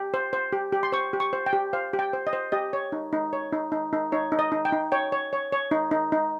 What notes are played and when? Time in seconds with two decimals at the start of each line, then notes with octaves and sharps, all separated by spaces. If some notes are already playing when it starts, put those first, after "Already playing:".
Already playing: G4
0.14 C5
0.33 C5
0.53 G4
0.72 G4
0.83 C6
0.92 C5 C#6
1.13 G4
1.20 C#6
1.33 C5
1.46 G5
1.53 G4
1.73 C5 F5
1.93 G4
1.99 G5
2.13 C5
2.27 D#5
2.33 C5
2.52 G4 D#5
2.73 C#5
2.92 D#4
3.13 D#4
3.33 C#5
3.53 D#4
3.72 D#4
3.93 D#4
4.12 D#4 C#5
4.32 D#4
4.39 D#5
4.52 D#4
4.65 G5
4.72 D#4
4.92 C#5 G5
5.12 C#5
5.33 C#5
5.52 C#5
5.71 D#4
5.91 D#4
6.12 D#4